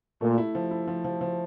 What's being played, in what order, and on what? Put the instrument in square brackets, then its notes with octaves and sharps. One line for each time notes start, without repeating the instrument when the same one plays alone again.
[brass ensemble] A#2 [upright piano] A3
[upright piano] E4
F3
E4
F3
F3
F3